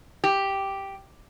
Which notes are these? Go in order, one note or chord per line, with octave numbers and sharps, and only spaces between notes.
G4